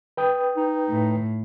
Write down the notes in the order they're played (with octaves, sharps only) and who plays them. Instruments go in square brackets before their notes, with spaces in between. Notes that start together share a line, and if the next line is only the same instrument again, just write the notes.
[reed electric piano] B4 G5 D#6
[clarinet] D#4
[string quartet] A2